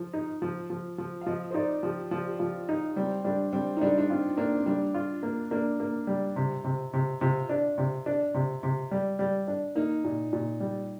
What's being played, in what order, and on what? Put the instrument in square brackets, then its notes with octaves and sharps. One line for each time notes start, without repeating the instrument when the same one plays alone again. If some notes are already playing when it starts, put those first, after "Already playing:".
Already playing: [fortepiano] F3
D#4
F3
F3
F3
[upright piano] F5
[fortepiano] F3 [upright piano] D#5
[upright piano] C5
[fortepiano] D#4 [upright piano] D5
[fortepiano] F3 [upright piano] G4
[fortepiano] F3 [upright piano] F4
[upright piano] G4
[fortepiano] F3 [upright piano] F4
[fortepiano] D#4
[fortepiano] G3 [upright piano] C4
[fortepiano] G3 [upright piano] D4
[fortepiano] G3 [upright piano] C4
[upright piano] D#4
[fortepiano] G3 [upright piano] D4
[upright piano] D4
[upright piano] C4 [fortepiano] F4
[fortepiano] A#3 [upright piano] D4
[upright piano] C4
[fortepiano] G3 [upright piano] D4
[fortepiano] F4
A#3
[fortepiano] A#3 [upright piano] D4
[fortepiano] A#3
G3
C3
C3
C3
[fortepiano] C3 [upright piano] F4
[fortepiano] D4
C3
D4
C3
C3
G3
G3
D4
[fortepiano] A#3 [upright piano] D#4
[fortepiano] A#2
A#2
G3